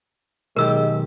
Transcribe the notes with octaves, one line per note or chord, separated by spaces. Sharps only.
B1 D#3 G#3 G4 A#4 E6